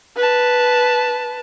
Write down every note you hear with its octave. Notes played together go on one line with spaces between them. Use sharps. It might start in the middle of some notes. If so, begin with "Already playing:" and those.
B4 A5